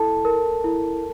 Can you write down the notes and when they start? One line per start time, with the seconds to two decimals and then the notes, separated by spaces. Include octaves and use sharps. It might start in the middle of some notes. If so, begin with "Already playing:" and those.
Already playing: E4 A4 A5
0.25 A#4
0.64 E4